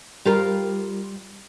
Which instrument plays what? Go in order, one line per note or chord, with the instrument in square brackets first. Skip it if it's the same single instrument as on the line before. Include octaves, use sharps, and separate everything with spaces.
[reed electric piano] G3 [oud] F4 G4 A#4